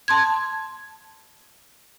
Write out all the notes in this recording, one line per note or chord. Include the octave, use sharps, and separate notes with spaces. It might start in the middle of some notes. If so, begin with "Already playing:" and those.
A5 C6 G#6